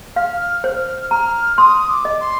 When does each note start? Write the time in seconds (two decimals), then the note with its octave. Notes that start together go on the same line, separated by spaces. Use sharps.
0.16 F5 F6
0.40 F6
0.64 C5 F6 G6
1.11 A#5 F6
1.58 C6 D#6
1.89 D6
2.05 D#5
2.21 C6